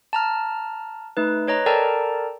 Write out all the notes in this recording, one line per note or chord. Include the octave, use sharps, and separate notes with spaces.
A5 A#5 F6
A3 D#4 B4
B4 C#5 D#5 A#5
A4 A#4 D5 G5 A5 A#5